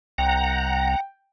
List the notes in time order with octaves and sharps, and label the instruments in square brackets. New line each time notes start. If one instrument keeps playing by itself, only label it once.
[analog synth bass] C2 [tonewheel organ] F#5 A#5 [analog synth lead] G5